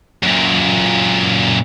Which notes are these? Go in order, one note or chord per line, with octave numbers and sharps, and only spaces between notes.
F#2 A#2